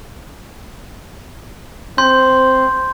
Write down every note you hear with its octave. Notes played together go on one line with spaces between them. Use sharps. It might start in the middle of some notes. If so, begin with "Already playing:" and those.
C4 C6 G6